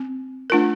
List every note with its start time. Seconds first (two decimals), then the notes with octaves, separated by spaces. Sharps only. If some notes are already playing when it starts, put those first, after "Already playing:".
Already playing: C4
0.50 A3 D4 F4 A#4